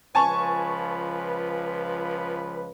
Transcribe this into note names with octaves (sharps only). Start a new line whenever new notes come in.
C#2 F3 B4 G#5 A5 C#6